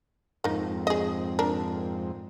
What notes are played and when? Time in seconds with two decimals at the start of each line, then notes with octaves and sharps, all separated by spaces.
0.44 F2 G#2 A#3 C4 D#4
0.87 G#4 D#5
1.39 D4 A#4